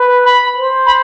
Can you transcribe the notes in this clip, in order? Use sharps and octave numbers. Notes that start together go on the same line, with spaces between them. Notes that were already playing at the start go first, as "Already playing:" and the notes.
Already playing: B4
B5
C5
B5